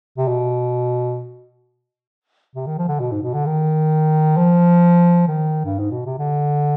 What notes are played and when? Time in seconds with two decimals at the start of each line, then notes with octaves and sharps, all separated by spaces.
0.18 C3
0.28 B2
2.55 C3
2.67 D#3
2.78 F3
2.88 D3
3.00 B2
3.12 G#2
3.23 B2
3.34 D3
3.46 D#3
4.37 F3
5.28 D#3
5.65 G2
5.79 G#2
5.92 B2
6.06 C3
6.18 D3